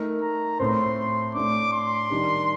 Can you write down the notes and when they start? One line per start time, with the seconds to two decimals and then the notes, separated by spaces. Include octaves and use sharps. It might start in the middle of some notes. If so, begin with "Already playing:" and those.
Already playing: A3 D#4 A#4
0.22 A#5
0.60 A2 A3 C4 C6
1.35 A2 A3 D4 D6
1.73 C6
2.10 D#3 G3 D4 G4